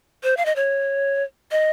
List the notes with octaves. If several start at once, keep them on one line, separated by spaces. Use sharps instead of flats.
C5
F5
D#5
C#5
D#5